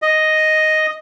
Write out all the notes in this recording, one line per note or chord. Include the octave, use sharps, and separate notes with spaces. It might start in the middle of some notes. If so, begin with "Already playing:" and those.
D#5